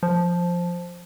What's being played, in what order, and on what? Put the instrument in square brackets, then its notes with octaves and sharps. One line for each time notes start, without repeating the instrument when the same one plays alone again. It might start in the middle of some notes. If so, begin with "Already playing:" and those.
[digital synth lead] F3